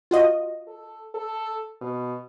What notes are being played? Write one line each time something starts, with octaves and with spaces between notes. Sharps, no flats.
F4 F#4 D#5
A4
A4
B2